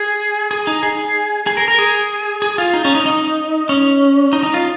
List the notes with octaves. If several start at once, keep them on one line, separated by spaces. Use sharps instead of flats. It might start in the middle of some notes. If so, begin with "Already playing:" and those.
Already playing: G#4
G#4
D#4
G#4
G#4
A#4
A#4
G#4
G#4
F4
D#4
C#4
D#4
D#4
C#4
D#4
D#4
F4